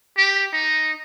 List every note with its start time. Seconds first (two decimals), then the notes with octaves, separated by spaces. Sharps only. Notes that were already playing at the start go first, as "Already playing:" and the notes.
0.17 G4
0.53 D#4